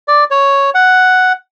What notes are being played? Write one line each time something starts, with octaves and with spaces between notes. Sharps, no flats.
D5
C#5
F#5